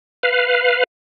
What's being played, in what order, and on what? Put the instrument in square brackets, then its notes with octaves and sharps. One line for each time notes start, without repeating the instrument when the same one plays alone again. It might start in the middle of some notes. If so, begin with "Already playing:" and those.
[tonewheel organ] B4 F5